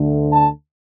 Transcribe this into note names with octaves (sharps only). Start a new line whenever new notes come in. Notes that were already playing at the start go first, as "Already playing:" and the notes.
Already playing: D2 D3 A3
A5